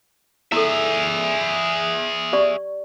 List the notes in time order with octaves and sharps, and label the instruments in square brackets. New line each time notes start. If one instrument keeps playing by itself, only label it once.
[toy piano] E4 A4 [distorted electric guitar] G#4 E5
[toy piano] G4 D5 C#6